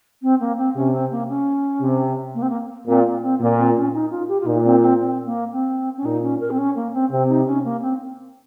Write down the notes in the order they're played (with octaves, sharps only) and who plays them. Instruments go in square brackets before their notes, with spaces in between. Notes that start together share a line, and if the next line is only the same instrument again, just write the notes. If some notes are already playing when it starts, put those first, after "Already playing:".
[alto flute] C4
A#3
C4
[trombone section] C3 [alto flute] C#4
[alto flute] C4
A#3
C#4
[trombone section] C3
[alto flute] A#3
C4
A#3
[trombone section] A#2 [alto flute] C4
[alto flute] A#3
C4
[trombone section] A#2 [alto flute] A#3
[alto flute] C4
C#4
D#4
F4
G4
F4
[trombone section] A#2 [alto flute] D#4
[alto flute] C4
C4
C4
A#3
C4
C#4
[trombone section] A#2 [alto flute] D#4
[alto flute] C#4
A#4
C4
C#4
A#3
C4
[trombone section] C3 [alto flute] C4
[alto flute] D#4
C#4
A#3
C4